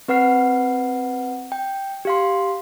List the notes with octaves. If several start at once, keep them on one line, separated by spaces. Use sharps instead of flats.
C4 B4 F#5 F6 C7
G5
G4 F5 C6